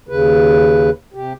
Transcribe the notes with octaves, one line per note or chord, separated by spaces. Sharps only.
D#2 C#3 B4
C3 G4